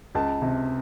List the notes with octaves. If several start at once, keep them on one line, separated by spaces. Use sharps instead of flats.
C#2 A5
C3